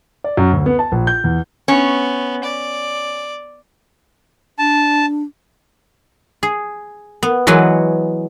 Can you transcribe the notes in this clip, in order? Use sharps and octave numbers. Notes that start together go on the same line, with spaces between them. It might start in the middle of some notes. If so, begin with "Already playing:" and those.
D5
F#2
D2
B3
A5
A#1
G6
E2
B3 C#4
D5
D4 A5
G#4
B3
E3 F#3 G#3 F#4 B4 G#5